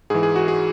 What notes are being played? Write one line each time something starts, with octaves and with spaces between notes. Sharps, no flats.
G#2 E3 G#4
G#4
F#4
G#4